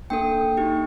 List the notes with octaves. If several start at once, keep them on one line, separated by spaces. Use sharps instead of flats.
A#3 D4 A4 G5
A#3 D#4 G4